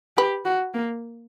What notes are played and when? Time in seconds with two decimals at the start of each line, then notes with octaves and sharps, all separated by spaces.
0.17 G4 B4
0.45 F#4
0.74 A#3